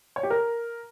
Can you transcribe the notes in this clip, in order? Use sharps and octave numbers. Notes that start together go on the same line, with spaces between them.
C#5
G4
A#4